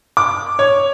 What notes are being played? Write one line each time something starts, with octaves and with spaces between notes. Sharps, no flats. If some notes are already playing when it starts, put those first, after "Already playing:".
D6
C#5